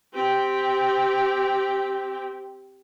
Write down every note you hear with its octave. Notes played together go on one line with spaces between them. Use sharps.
C4 G4